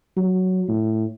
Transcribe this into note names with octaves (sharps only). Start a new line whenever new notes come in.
F#3
A2